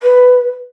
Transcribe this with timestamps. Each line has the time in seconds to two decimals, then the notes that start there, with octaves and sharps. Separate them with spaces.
0.02 B4